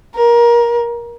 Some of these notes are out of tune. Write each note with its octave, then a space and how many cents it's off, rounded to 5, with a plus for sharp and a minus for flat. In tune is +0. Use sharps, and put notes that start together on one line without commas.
A#4 +20